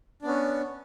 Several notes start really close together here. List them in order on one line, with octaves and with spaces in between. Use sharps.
D4 B3 C#4